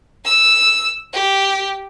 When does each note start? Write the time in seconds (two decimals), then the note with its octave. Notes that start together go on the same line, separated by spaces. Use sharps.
0.25 E6
1.13 G4